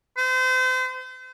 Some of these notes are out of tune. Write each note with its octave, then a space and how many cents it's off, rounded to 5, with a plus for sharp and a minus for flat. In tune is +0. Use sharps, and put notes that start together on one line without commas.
C5 -35